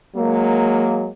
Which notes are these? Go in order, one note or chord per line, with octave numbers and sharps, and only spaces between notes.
F#3 G#3 A#3